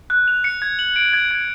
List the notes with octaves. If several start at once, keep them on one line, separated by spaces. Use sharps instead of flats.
F#6
F7
C#7
G#6
F#7
D7
G#6
G#6